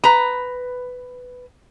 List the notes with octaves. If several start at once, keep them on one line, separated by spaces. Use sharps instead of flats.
B4 A#5